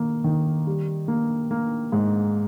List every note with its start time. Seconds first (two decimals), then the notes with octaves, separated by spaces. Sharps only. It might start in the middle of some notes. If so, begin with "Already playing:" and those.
Already playing: D#3 A#3
0.24 D#3
0.67 G3
1.08 A#3
1.51 A#3
1.92 G#2